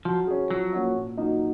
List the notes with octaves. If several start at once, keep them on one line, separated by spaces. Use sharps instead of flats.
F3 F#3
C#4 G#4
F3 F#3
A#3 C#4 F#4
A#2
F#3 A#3 D#4